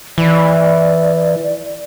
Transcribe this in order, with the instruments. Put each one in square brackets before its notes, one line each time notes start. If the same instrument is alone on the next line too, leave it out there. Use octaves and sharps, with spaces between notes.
[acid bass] E3 [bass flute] D5